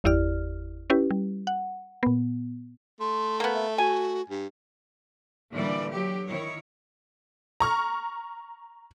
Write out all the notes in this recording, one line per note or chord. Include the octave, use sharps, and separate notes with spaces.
G1 E2 E4 G4 D5 F6
C#4 E4 G4 B4
G3
F#5
A#2 B3
A3 C6
A#3 B3
E5
F#4 G#5
G2
A#2 D3 E3 G3 D5
F#3 G4
D#3 E4 C#5
A#5 C#6 F6